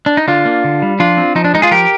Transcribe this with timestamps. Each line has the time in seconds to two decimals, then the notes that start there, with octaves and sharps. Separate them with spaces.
0.06 D4
0.17 D#4
0.28 D3 D4 F4
0.45 A#3
0.64 D3
0.82 G3
0.99 F3 D4 F4
1.17 C4
1.35 F3 D#4
1.45 D4
1.54 G#3 D#4
1.62 F4 G#4
1.71 F3 G4 A#4